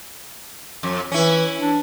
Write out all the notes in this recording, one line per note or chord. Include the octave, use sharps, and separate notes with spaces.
F2
E3 C#4 E4
D4